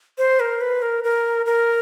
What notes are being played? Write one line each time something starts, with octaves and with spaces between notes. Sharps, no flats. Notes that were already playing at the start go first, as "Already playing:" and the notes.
C5
A#4
B4
A#4
A#4
A#4